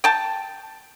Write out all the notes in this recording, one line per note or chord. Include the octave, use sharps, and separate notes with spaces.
G5 A5